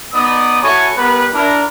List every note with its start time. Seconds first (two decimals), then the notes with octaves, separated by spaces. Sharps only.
0.14 B3 D#4 D5 D#6
0.63 E4 F#4 A4 C#5 G#5 C#6
0.97 G3 B3 A#4 B4
1.33 D4 E4 A#4